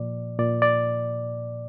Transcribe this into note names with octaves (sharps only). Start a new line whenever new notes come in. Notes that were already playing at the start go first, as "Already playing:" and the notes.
Already playing: A#2 F3 D5
A#2 D5
D5